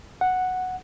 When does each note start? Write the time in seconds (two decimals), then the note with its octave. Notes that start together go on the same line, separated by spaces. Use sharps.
0.21 F#5